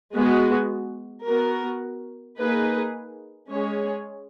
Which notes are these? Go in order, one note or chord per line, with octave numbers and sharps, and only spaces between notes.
G#3 B3 F#4
B3 F#4 A#4
A#3 D#4 G#4 B4
G#3 C#4 G#4 C#5